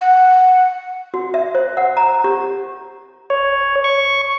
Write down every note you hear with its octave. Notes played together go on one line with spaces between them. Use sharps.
F#5
F#4
E5
C5
F#5
A#5
G4
C#5
C#6